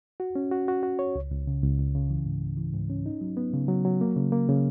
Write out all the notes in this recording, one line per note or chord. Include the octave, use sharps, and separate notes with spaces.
F#4
C#4
F#4
F#4
F#4
C#5
C#2
C#2
C#3
C#2
C#2
C#3
E3
G#2
G#2
E3
G#2
C#4
D#4
F#3
B3
C#3
F#3
F#3
A#3
C#3
A#3
C#3